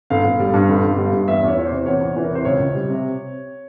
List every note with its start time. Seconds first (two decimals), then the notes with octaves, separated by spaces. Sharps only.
0.10 G1 F5
0.24 G1
0.40 G3
0.54 G2
0.69 G1
0.84 G1
0.98 G3
1.13 G2
1.27 E2 E5
1.43 E2 C#5
1.57 E3 C#5
1.66 C3 C5
1.86 E2 C#5
2.01 E2
2.16 E3
2.24 A#4
2.31 C3 C5
2.45 C#2 C#5
2.59 C#2
2.75 G3
2.90 C3